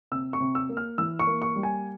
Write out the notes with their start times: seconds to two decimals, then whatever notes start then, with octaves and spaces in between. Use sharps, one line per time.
0.12 C3 E6
0.33 C#6
0.41 C3
0.55 E6
0.69 A#3
0.77 F6
0.98 E3 E6
1.19 C#6
1.27 A#3
1.42 C#6
1.56 G3
1.63 G#5